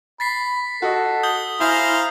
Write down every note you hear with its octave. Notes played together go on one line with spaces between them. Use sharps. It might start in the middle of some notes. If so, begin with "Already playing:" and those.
B5 A6 B6 C7
F#4 A4 D#5
D#6 G6 G7
E4 C5 F5 G#5 A#5